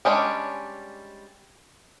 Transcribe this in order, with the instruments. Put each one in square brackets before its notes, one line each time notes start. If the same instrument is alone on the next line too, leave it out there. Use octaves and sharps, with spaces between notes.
[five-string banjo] G3 G#3 C#4 D4